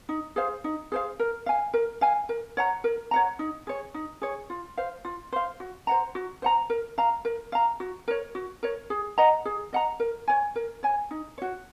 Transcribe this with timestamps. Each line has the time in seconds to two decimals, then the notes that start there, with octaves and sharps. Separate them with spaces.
0.09 D#4
0.36 G#4 C5 F5
0.64 D#4
0.92 G#4 C5 F5
1.19 A#4
1.46 F5 G#5
1.74 A#4
2.01 F5 G#5
2.29 A#4
2.57 C#5 F#5 A#5
2.84 A#4
3.11 C#5 F#5 A#5
3.39 D#4
3.67 G#4 C#5
3.94 D#4
4.22 G#4 C#5
4.50 F4
4.77 C5 F5
5.05 F4
5.33 C5 F5
5.60 F#4
5.87 C5 F#5 A#5
6.15 F#4
6.42 C5 F#5 A#5
6.70 A#4
6.98 F5 A#5
7.25 A#4
7.52 F5 A#5
7.80 F#4
8.08 A#4 C#5
8.35 F#4
8.63 A#4 C#5
8.90 G#4
9.18 D#5 F#5 A#5
9.45 G#4
9.73 D#5 F#5 A#5
10.00 A#4
10.28 C#5 G#5
10.56 A#4
10.83 C#5 G#5
11.11 D#4
11.38 F#4 C#5